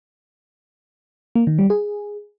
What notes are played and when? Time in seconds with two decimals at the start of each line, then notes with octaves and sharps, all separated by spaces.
1.35 A#3
1.47 D#3
1.59 G3
1.70 G#4